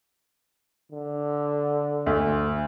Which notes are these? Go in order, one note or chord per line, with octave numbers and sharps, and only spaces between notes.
D3
D2